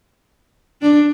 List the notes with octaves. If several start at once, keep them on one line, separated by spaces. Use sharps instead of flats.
D4